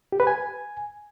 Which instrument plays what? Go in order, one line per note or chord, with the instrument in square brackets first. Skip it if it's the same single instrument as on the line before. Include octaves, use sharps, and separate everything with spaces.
[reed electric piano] G4
B4
G#5